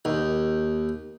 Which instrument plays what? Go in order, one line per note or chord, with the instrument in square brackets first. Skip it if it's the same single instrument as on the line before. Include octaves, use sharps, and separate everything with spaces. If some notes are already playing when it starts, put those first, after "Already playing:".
[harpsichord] D#2